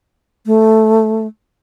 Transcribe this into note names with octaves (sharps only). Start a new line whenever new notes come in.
A3